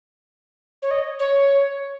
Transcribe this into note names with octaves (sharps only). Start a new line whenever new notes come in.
C#5
D#5
C#5